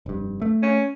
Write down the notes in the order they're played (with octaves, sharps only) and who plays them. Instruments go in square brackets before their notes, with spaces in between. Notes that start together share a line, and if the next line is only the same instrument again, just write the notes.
[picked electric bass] F1 G2
A3
[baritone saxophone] C#4